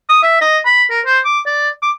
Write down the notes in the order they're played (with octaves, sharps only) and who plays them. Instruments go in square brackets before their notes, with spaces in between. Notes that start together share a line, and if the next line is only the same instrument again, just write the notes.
[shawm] D#6
E5
D#5
B5
A#4
C5
D6
D5
D6